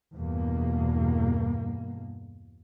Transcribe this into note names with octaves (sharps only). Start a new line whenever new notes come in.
E2 G2 B2 A#3